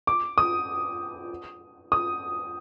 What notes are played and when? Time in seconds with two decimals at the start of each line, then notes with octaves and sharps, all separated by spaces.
0.07 D6
0.38 D#6
1.92 D#6